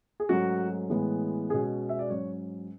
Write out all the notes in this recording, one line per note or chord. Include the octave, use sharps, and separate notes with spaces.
G#4
G#2 F#3 A3 C#4 F#4
A2 E3 G#3 B3
B2 G#3 C#4 G#4
E5
D5
G#2 F#3 C#4 C#5